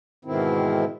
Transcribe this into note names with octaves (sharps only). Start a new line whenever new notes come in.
G#2 B2 D#3 E3 C4 E4